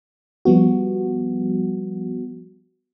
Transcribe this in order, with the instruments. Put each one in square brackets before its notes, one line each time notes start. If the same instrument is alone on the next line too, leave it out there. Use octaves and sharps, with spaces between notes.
[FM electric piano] F3 G3 B3 F#4